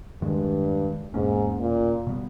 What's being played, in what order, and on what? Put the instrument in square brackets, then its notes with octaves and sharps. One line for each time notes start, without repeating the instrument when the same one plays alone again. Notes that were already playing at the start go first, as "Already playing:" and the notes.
[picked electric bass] E2 D#3 G#3 [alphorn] G2
[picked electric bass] E2 B2 A#3 C#4 [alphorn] G#2
[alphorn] A#2
[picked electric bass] B2 G3 B3